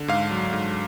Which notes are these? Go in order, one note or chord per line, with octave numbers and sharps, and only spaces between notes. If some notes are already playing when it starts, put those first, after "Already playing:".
Already playing: D3
G#2 F5
F#3
G#2